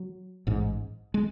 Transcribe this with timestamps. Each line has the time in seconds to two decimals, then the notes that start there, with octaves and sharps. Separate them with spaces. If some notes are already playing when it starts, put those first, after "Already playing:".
Already playing: F#3
0.47 A1 G#2
1.14 G#3